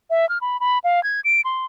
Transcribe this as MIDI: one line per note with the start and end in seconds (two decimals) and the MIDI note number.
0.10 0.28 76
0.29 0.38 89
0.41 0.60 83
0.60 0.79 83
0.84 1.03 77
1.04 1.20 92
1.25 1.41 98
1.45 1.65 84